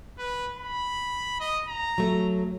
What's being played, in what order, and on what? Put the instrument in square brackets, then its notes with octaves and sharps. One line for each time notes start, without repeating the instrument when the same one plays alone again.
[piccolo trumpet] B4
B5
D#5
A#5
[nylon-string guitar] F#3 A3